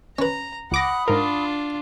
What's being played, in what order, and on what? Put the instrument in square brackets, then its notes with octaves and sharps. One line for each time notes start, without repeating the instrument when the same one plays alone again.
[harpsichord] C#4 B4 [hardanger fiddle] A#5
[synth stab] C#2 D6 A#6 [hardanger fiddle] F#5 [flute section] B5 D#6
[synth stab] G#2 A#4 [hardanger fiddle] D4 F4